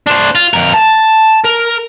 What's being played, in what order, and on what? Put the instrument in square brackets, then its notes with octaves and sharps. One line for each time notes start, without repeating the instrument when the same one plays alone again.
[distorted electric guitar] D4 C5
F4
F2 A#4
A5
A#4